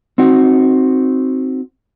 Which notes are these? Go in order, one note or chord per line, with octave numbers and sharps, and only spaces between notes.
C4 D#4 F#4